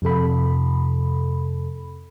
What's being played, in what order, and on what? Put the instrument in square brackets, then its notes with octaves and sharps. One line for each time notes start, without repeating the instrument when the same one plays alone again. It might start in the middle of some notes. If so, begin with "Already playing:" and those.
[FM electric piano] F2 C3 A4 B5